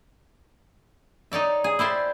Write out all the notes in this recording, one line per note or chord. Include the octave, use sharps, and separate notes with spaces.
D#4 C#5 D5 E5
G#4
E4 G4 C5 D5